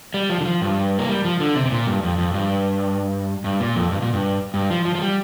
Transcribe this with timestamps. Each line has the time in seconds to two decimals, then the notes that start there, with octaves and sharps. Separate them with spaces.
0.14 G3
0.30 F3
0.41 D3
0.45 F3
0.62 G2
0.99 A#3
1.09 G3
1.25 F3
1.40 D3
1.55 C3
1.66 C3
1.71 A#2
1.87 G2
2.03 F2
2.18 F2
2.34 G2
3.44 G2
3.60 A#2
3.76 F2
3.92 G2
4.02 A#2
4.13 G2
4.54 G2
4.70 F3
4.85 F3
4.95 F3
5.02 G3